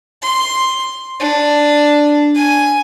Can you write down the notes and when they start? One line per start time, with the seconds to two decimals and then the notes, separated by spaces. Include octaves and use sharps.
0.22 C6
1.20 D4
2.35 G#5